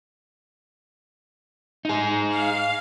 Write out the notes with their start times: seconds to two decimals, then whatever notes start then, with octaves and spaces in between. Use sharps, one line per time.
1.85 D#4 G#4
2.28 F5